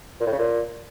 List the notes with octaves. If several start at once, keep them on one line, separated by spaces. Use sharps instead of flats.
A#2
A2
C#3
A#2